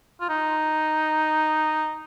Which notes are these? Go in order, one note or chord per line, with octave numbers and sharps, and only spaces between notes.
F4
D#4